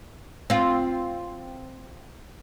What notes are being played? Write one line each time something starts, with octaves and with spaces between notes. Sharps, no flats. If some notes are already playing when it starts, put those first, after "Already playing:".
C4 F4